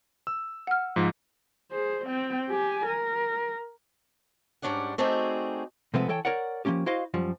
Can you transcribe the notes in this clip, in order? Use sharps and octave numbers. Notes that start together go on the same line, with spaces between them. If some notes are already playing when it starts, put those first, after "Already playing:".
E6
F#5 F6
G#2 F3
G#4 C5
C4 G5
G4 G#5
A#4
G#2 G3 C#4 D4 D5 F#5
A3 C4 D#4 F#4 G#4 D5
C3 F3 G#3 A3 B3 C4
E3 A4 C#5 G5
A#4 C#5 D5 F#5
F3 G#3 A#3 C#4 G4
E4 F#4 C5 D#5 F5
F#2 F3 G3